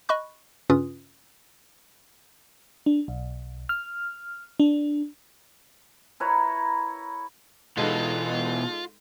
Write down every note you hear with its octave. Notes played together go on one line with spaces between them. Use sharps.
D#5 B5 C#6 F#6
G2 C#3 C#4 F4 B4 D#6
D4
B1
F6
D4
E4 A#4 B4 C#5
B2 E3 G#3 D#4 F4 A4